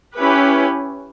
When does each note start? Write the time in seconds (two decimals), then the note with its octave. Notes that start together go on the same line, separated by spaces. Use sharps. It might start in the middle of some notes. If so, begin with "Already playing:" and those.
0.16 C#4 E4 G4 B4